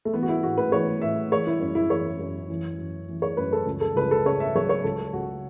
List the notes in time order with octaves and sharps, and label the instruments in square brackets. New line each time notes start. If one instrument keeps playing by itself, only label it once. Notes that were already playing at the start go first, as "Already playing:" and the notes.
[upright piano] A3
E3 B3
F#4
E4
A2 F#4
B4
E3 C#5
A2 E5
E3 C#5
E4
F#2 C#4
E4
E3 C#5
F#2
E3
F#2
E3
C#5
F#2 B4
A4
C#2
A4
C#2 B4
A4
C#3 C#5
E5
F#3 C#5
C#5
C#2 A4
C#2 F#4